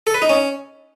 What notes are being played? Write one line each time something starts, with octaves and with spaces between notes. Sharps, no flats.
A4
B4
D#4
C#4